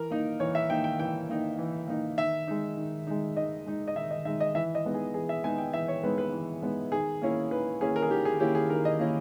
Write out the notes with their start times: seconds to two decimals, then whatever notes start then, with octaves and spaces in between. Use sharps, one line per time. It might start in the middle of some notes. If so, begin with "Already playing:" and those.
Already playing: E3 A#4
0.11 A#3 D#4
0.40 E3 C#5
0.55 E5
0.70 A#3 D#4 G5
0.84 G5
0.99 E3 G5
1.29 A#3 D#4
1.58 E3
1.88 A#3 D#4
2.18 D#3 E5
2.47 G#3 D#4
2.77 D#3
3.07 G#3 D#4
3.37 D#3 D#5
3.66 G#3 D#4
3.88 D#5
3.95 D#3 E5
4.11 D#5
4.25 G#3 D#4 E5
4.40 D#5
4.55 E3 E5
4.75 D#5
4.85 G#3 B3 D#4
4.94 G#4
5.14 E3 G#4
5.29 E5
5.44 G#3 B3 D#4 G#5
5.58 G5
5.73 E3 E5
5.88 C#5
6.03 G#3 B3 D#4 B4
6.18 B4
6.32 E3
6.62 G#3 B3 D#4
6.92 D#3 G#4
7.22 A#3 C#4 E4
7.51 D#3 B4
7.81 A#3 C#4 E4 G#4
7.96 A#4
8.02 G#4
8.10 D#3 G4
8.25 G#4
8.40 A#3 C#4 E4 G4
8.55 G#4
8.69 D#3 A#4
8.85 D#5
8.99 A#3 C#4 E4